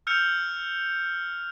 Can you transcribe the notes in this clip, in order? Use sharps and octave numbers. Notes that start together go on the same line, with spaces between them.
E6 F6 G6 C#7 F7